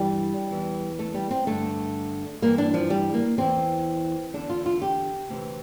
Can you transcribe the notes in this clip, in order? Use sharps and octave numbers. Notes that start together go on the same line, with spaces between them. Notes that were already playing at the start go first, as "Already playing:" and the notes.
Already playing: G2 E3 G3
E2 E3
A3
G3
C4
G2 D3 A3
G2 E3 A#3
D4
F3
G3
A#3
E2 E3 C4
E2 D3 D4
F4
F4
G4
D2 C3 E3